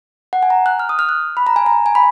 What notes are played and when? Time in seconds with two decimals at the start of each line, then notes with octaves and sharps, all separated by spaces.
0.33 F#5
0.43 G#5
0.50 A#5
0.66 F#6
0.79 F6
0.89 D#6
0.99 F6
1.09 F#6
1.37 B5
1.47 A#5
1.56 G#5
1.66 A#5
1.86 G#5
1.95 B5